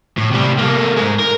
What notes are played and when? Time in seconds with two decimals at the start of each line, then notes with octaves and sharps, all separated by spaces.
0.18 A2
0.32 C3 G3
0.59 A3 A#3
0.97 G#2 G#3
1.20 A#4